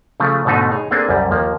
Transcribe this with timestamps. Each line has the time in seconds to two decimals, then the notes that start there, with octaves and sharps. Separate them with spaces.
0.20 C#3 F3 A3
0.45 G#2 B2 D3 A3 D#4
0.71 D#4 G#4 C#5
0.91 A#3 C4 D4 G#4 A4 G#5
1.09 C2 F#2 G3
1.31 D#2 F3 A#3